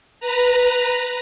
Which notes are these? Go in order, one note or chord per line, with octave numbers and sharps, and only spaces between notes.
B4 A#5